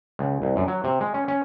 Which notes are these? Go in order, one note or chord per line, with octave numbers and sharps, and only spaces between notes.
C#2
C2
F#2
F#3
C3
G#3
C#4
C#4